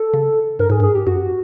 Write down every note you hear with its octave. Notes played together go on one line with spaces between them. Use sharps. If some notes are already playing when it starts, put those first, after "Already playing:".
Already playing: A4
C#3
G2 A#4
G#2 G#4
G2
G#4
G4
F#2 F#4